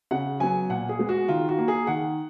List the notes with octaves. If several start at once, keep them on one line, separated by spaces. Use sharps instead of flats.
C#3 F#5
F#3 B3 G#5
A#2 F#5
G#4
G#3 B3
F#4
D#3 F4
F#4
A#3
G#4
D#3 F#5